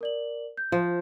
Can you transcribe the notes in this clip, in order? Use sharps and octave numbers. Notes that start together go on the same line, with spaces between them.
A#4 D5 F#7
G6
F3